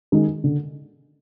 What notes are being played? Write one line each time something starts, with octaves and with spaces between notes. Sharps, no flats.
D#3 G#3 D#4
D3